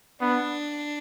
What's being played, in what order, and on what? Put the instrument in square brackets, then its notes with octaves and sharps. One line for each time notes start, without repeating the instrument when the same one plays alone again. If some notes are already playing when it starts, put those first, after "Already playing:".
[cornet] B3 [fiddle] D4